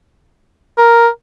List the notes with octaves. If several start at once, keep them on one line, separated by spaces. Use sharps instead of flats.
A#4